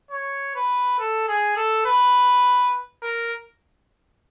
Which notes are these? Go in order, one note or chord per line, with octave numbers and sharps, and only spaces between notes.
C#5
B4
A4
G#4
A4
B4
A#4